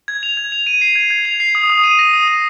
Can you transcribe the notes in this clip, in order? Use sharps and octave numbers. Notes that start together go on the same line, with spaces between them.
G#6
F7
G#6
F7
D#7
C7
G#6
G#6
F7
C7
D#6
D#6
D#7
A#6
D#6
D#6